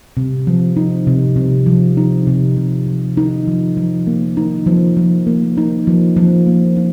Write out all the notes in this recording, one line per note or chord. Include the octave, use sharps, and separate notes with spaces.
C3
F3
D#4
C3
C3
F3
D#4
C3
C3
F3
D#4
F3
F3
A#3
D#4
F3
F3
A#3
D#4
F3
F3
A#3
D#4